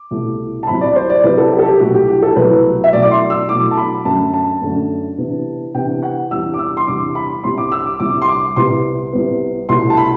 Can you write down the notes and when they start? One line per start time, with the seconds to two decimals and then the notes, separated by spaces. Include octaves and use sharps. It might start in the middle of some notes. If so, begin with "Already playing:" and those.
Already playing: D6
0.11 C2 B2 A3 E4
0.63 A5
0.67 C2 C3 F#3 C4 E4 B5
0.81 D5
0.95 C5
1.10 D5
1.23 C2 C3 F#3 C4 E4 B4
1.38 A4
1.52 G4
1.59 A4
1.66 G4
1.80 C2 B2 F#3 A3 E4 F#4
1.94 G4
2.08 G4
2.22 A4
2.36 C2 B2 F#3 A3 E4 B4
2.84 E5
2.93 B2 F#3 A3 E4 D5
3.02 D6
3.11 C6
3.30 E6
3.49 B2 F#3 A3 E4 D6
3.71 A5
3.77 B5
4.05 F#2 D3 A3 A5
4.33 A5
4.62 F#2 D3 A3
5.18 C3 E3 B3 D4
5.74 C3 E3 B3 D4 G5
6.03 F#5
6.31 E2 C3 G3 D4 E6
6.54 D6
6.59 E6
6.77 C6
6.87 E2 C3 G3 D4 D6
7.15 B5
7.43 C2 C3 G3 C6
7.58 D6
7.72 E6
7.86 D6
8.00 C2 C3 G3 D6
8.22 C6
8.28 D6
8.56 C2 C3 G3 B3 C6
9.13 C2 C3 G3 B3
9.69 C2 B2 A3 E4 C6
9.90 A5
9.97 B5